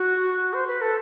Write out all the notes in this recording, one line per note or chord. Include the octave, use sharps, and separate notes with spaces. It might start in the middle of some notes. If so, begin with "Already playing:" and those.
Already playing: F#4
C5
B4
A4